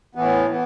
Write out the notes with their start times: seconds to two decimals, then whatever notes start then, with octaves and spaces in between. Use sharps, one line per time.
0.15 A2 E3 B3
0.50 E3 B3